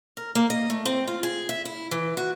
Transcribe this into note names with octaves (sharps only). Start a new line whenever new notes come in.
A#4
A#3
D#5
A3
C4
F4
G#4
E5
E4
E3
F#4